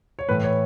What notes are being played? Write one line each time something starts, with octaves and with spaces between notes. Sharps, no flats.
C#5
A2 E3 A3 B4
C#5